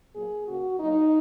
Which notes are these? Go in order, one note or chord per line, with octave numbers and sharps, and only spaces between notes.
A#2 F#3 A#3 G#4
C#3 A#3 F#4
A#2 F#3 A#3 D#4